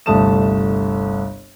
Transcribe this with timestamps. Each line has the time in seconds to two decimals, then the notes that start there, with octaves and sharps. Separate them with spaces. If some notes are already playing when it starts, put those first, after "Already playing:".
0.06 G1 C2 A3 A5 D#6 E7